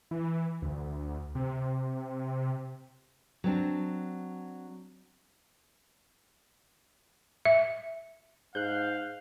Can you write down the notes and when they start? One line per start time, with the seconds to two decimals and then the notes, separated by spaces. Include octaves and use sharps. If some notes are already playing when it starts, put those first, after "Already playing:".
0.11 E3
0.62 D2
1.35 C3
3.44 F#3 C4 D4
7.45 E5
8.55 G#2 F5 F#6 G6